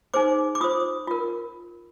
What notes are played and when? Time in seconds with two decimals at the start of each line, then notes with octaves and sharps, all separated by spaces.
0.14 D#4 G#4 C5 D6
0.55 D6
0.60 F4 C5 D#6
1.08 F4 A#4